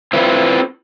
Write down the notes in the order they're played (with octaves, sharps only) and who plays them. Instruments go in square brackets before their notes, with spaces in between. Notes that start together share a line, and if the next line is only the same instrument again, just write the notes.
[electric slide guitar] C4 E4 F4 B4